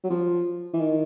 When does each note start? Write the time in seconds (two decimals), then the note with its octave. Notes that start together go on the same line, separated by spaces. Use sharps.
0.04 F#3
0.10 F3
0.73 E3
0.81 D#3